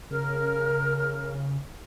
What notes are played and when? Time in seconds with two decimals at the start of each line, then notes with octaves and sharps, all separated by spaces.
0.11 C#3 A#4 F6